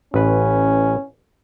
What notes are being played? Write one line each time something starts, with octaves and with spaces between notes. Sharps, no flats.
A1 C#4 B4